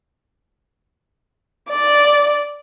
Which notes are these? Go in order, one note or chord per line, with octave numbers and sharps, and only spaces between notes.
D5